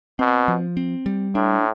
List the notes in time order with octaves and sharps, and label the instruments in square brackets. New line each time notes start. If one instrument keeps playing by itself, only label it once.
[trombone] B2 [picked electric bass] C4
[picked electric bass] F3
C4
G3
[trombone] A2 [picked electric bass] D4